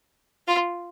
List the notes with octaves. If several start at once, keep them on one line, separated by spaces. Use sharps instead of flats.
F4